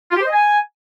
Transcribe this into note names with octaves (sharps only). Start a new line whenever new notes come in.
F4
G4
C5
D#5
G#5